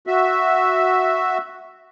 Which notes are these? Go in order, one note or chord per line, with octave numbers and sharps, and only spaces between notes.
F#4 E5